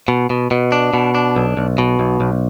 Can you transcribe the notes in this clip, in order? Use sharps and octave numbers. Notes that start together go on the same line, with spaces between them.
B2
B2
B2
D4
B2
D4
B1
B1
B2
B1
B1